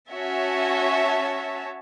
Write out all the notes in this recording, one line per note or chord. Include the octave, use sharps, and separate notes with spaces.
C#4 F#4 C#5 E5 A5